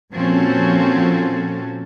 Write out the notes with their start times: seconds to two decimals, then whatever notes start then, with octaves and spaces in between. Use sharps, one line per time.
0.15 A#2 F3 C4 C#4 F#4 A4